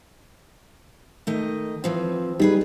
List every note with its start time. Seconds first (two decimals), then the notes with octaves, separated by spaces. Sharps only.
1.27 D#3 A3 D#5
1.84 E3 F3 C4
2.40 D#3 G3 D#4 G#4 B4